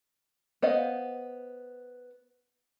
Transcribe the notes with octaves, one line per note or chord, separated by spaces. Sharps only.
B3 C5 D#5 F5